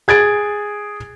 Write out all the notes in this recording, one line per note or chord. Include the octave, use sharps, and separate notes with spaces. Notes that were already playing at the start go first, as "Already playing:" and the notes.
G#4 G#6 A6 D7